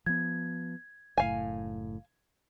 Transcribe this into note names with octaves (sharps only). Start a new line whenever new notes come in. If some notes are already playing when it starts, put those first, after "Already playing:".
F3 B3 G#6
F#1 A2 F5 G#5